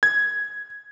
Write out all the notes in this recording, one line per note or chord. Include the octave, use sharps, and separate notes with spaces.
G#6